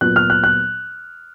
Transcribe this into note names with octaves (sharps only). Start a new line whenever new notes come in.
A#2 F#3 B3 F#6
F6
F#6
F#6